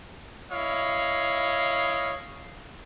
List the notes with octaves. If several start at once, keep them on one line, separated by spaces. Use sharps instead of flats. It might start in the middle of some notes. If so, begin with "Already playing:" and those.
E4 C#5 D#5 F5